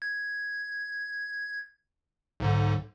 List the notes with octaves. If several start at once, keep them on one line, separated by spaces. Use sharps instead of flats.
G#6
B1 G#2 D3